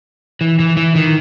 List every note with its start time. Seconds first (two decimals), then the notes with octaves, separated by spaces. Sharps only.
0.41 E3
0.60 E3
0.77 E3
0.95 D#3